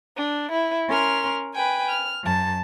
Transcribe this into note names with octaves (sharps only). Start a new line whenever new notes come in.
D4
E4
C#4 A#4 C6 F6
B4 G5 G#5
F6
F#2 A5